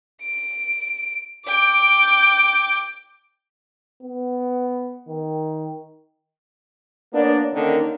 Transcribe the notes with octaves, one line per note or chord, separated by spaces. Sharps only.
D7
G5 D6
B3
D#3
A#3 B3 D4 A#4 C#5 D5
D3 D#3 A#3 C#4 D#4 A4